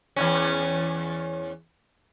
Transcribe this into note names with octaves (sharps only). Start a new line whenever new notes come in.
E2 G2 C#4